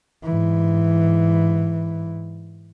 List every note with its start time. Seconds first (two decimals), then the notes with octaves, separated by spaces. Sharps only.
0.23 G#2 E3